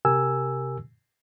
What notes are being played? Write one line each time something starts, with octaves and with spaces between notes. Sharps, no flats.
C3 G4 A#4 G#5 E6